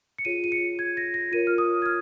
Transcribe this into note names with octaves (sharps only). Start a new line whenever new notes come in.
C#7
F4 G#4 C#5 D#7
D#7
C#7
G#6
A#6
A#6
F4 A#4 C#5 D#7
F6
D#6
G#6
F6